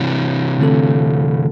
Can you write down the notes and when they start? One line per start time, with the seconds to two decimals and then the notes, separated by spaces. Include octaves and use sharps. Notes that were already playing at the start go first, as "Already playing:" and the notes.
Already playing: C3 E3 G#3
0.59 D3 A3 C4 F4 A4